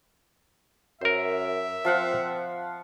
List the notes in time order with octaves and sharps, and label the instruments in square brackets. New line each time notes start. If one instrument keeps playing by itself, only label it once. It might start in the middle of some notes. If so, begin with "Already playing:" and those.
[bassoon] F#2 [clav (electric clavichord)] A#4 C5 [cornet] E5
[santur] F3 F5 F#5 [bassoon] C4